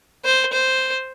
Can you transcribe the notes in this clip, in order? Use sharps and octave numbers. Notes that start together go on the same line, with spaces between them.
C5
C5